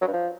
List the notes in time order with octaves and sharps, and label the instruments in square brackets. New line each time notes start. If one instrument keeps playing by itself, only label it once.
[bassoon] F#3
G2
F3